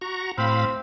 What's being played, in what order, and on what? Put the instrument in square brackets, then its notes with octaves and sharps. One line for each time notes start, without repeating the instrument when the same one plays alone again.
[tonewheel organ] F#4 A#5 C#6
[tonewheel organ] A2 F5 B5 [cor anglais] C4